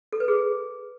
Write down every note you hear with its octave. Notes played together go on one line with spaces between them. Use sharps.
A4
B4
G#4